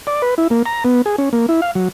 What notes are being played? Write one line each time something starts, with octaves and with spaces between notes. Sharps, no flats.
D5
B4
E4
A#3
A#5
B3
G#4
C#4
A#3
E4
F5
F#3